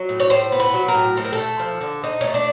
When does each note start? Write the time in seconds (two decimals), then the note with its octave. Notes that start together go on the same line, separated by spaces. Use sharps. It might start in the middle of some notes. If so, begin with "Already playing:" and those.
Already playing: F#3
0.09 A2
0.20 C#5
0.30 A2 C5
0.52 B3
0.60 B4
0.74 F#3
0.88 A#4
0.94 A2
1.17 C4 A4
1.25 A#4
1.33 A4
1.38 A3
1.59 F3
1.81 D3
2.03 C4 D#4
2.21 C#4
2.24 A3
2.34 D4